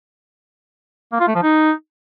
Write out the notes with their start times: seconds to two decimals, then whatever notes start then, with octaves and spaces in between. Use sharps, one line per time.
1.12 A#3
1.20 F4
1.27 A3
1.35 F3
1.42 D#4